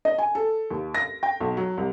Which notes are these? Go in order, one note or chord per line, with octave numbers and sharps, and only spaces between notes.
D#5
G#5
A4
D#2
A#6
G5
B1
F#3
C2